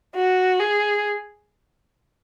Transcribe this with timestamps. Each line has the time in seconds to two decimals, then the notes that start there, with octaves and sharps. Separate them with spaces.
0.16 F#4
0.60 G#4